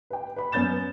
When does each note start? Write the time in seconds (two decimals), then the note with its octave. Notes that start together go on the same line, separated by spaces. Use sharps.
0.10 B4 G5
0.36 B4 B5
0.52 F#2 B3 C#4 G6 A6 E7